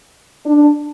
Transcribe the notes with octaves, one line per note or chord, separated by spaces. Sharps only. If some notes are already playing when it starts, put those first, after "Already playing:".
D4